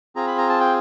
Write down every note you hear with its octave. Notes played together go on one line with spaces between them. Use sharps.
C4 F4 G#4 A#5
B5
A#5
A5
G5